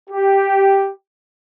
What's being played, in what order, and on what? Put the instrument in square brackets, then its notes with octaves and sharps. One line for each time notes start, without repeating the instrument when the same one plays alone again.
[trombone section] G4